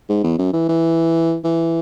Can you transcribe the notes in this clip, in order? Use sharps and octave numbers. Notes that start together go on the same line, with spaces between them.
G#2
E2
F#2
E3
E3
E3